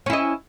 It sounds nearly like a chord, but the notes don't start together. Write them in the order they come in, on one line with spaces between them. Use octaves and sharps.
C#4 E4 D#5